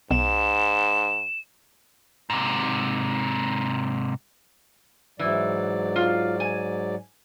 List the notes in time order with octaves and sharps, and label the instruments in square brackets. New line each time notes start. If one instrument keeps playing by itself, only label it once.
[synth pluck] B1 [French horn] G#2 [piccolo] E7
[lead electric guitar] G#2 C3
[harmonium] G#2 F#3 D5 [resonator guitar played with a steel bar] E3
[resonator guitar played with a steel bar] F4
G#5